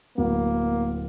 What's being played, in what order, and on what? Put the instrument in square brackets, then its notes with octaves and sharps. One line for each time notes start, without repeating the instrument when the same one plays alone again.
[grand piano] D1 F#3 B3 [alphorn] A#3